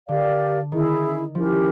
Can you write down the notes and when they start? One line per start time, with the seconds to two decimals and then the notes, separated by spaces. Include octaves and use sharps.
0.08 D3 G4 A#4 D5 F5
0.72 D#3 C#4 E4 G#4
1.35 F3 C#4 E4 G4 A#4